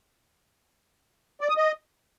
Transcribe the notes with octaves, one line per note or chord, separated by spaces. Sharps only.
D5
D#6
D#5